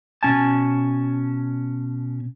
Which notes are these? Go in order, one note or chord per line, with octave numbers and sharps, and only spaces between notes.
B2 C#4 G#5 A5